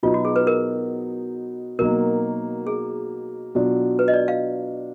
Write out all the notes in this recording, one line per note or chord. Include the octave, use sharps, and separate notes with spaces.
B2 F#3 B3 D#4 F4
F#4
G#4
B4
A#4
B2 F#3 A#3 D#4 A#4
G#4
B2 F#3 D4 F4
B4
D#5
D5
F5